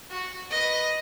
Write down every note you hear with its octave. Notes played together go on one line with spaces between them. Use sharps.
F#4
B4 D#5